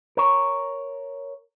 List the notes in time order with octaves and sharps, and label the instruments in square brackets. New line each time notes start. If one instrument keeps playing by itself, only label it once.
[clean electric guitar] A#4 C#5